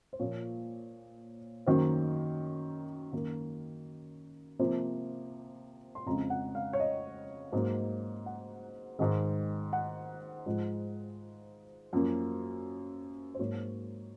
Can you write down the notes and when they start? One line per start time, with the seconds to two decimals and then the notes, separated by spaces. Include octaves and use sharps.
0.13 C5
0.19 A#2 F3 A#3 C#5
1.66 F#2 D#3 F#3 A#3 C5
3.13 F#2 D#3 A#3 A#4
4.59 C3 F3 A#3 C5
5.95 C6
6.06 F2 C#3 G#3 A#5
6.30 F#5
6.55 F5
6.73 C#5
6.80 D#5
7.53 G#2 F#3 A#3
8.26 F#5
8.99 G#2 D#3 G#3
9.73 F#5
10.46 G#2 F3 G#3
11.93 F#2 F3 A#3
13.35 C5
13.39 G#2 F#3 A#3 C#5